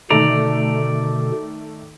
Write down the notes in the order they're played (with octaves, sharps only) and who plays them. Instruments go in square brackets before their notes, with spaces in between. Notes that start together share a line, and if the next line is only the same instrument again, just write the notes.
[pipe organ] B2 D3 [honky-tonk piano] D#3 A3 A4 [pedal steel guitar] D5 A#5